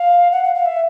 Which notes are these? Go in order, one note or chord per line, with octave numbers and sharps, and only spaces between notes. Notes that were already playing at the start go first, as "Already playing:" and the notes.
Already playing: F5
F#5
F5
F5
E5